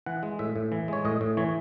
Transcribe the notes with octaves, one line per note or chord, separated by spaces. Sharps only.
E3 F#5
G#3
A2 E5
A2
E3
G#3 C#5
A2 D#5
A2
E3 C#5